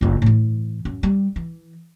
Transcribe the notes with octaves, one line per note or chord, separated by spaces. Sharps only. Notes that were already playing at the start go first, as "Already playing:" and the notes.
F#1 F4
A2 E3
F#2
G3
E3